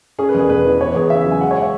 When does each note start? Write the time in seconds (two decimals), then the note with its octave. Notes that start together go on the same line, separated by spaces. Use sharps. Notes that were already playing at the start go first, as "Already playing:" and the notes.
0.19 C#4 G#4
0.29 B4
0.35 E1 G#4
0.49 E2 B4
0.65 E3
0.80 B3 C#5
0.95 E2 G#4
1.10 C#3 E5
1.26 F#3
1.31 G#5
1.41 G#3 F#5
1.51 C#5
1.62 E5